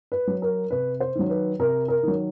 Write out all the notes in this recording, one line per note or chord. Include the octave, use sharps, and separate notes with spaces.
B4
F#3
A#4
C3 B4
C5
D#3 F#3
B4
C3 A#4
A#4
D#3 F#3